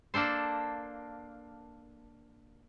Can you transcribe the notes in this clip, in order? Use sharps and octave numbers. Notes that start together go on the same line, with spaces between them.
A#3 D4 A4 C5